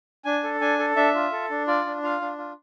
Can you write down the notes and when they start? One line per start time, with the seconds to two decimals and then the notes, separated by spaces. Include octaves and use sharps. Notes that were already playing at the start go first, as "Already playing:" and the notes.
0.25 D4 G#5
0.43 A4
0.61 D4 G#5
0.79 A4
0.96 D4 E5
1.15 F4
1.32 A4
1.50 D4
1.67 F4 D5
1.86 D4
2.03 F4 F5
2.21 D4
2.38 F4